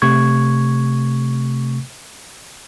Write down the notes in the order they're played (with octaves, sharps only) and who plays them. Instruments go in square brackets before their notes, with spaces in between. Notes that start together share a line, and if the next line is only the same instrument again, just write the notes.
[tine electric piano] C3 A3 C#6 G#6